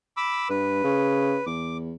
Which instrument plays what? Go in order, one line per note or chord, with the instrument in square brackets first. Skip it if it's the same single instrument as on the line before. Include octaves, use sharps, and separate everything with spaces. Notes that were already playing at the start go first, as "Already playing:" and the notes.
[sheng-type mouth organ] B5 D6 E6
[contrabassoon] G2 [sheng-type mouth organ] B4
[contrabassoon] C#3
[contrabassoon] E2 [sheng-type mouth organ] D6